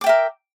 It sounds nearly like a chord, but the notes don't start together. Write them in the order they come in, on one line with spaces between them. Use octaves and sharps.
D6 G5 E5 A#4